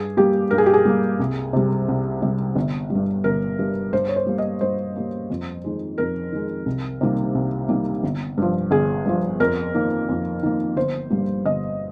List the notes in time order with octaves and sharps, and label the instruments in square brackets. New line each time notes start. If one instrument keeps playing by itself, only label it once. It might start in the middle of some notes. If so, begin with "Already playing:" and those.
Already playing: [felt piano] G2 G#4
G3 A#3 G4
G2 A#4
G#4
G4
G#4
G3 A#3
C2
C3 G3
C2
C3 G3
G1
G3
G2
G1 A#4
G2 G3
G2 C5
C#5
C5
G3 A#3
D#5
G2 C5
G3 A#3
F2
D#3 G#3
F2 A#4
D#3 G#3
C2
C3 D#3 G3 A#3
C2
C3 D#3 G3 A#3
G1
G2 F3
G1 G#4
G2 F3
F2 A#4
D#3 A#3
F2
D#3 A#3
G1 C5
G2 G3 A#3
G1 D#5